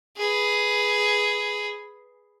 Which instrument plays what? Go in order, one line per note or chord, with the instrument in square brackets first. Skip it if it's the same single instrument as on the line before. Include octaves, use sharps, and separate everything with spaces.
[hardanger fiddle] G#4 B4